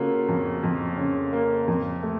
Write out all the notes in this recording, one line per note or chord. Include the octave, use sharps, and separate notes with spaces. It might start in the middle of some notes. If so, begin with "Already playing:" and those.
Already playing: C#3 A#3 F4 F#4 A4
F2
F2
C#3
A#3
F2
A3